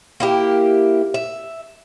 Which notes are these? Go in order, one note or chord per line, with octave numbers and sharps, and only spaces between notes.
A#3 E4 G4
E5